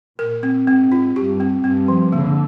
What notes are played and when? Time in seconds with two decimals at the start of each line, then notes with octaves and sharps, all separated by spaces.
0.18 A#2 A#4
0.43 C4
0.67 G#2 C4
0.92 F4
1.16 G2 G4
1.40 C4
1.64 G2 C4
1.88 F3
2.12 D3 A#3